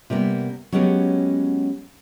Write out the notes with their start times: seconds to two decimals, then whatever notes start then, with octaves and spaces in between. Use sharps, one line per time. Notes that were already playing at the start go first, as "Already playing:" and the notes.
0.10 C3 G3 A#3 B3
0.72 F#3 G#3 B3 C#4 G4